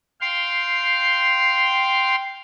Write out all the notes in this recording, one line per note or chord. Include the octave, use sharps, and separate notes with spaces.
F5 G5 C6